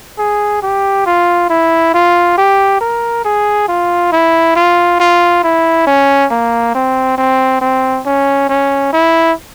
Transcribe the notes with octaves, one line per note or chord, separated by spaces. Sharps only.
G#4
G4
F4
E4
F4
G4
A#4
G#4
F4
E4
F4
F4
E4
C#4
A#3
C4
C4
C4
C#4
C#4
E4